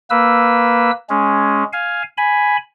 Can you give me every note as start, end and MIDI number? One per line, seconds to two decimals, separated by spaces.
0.10 0.91 58
0.10 0.91 71
0.10 0.91 88
1.10 1.64 56
1.10 1.64 61
1.73 2.03 77
1.73 2.03 80
2.18 2.57 80
2.18 2.57 83